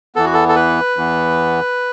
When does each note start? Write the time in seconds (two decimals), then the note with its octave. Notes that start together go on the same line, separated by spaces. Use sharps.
0.15 E2 E3 B3 A4
0.25 F#4
0.34 A4
0.49 A4
0.55 B4
0.96 E2 E3 B3